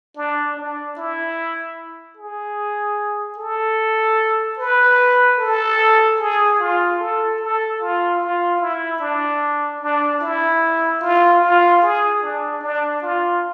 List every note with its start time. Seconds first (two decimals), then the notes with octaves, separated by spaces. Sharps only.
0.16 D4
0.57 D4
0.97 E4
2.17 G#4
3.38 A4
4.59 B4
5.39 A4
6.19 G#4
6.59 F4
6.99 A4
7.40 A4
7.81 F4
8.20 F4
8.60 E4
9.00 D4
9.81 D4
10.21 E4
11.01 F4
11.42 F4
11.82 G#4
12.22 D4
12.62 D4
13.02 F4